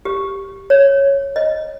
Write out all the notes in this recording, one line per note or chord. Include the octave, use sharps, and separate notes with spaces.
G4
C#5
D#5